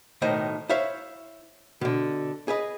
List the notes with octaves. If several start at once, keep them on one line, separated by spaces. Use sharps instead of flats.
B1 A2 D#3 C5 D#5
E4 C5 C#5 E5 F5
B2 D3
G#4 B4 D#5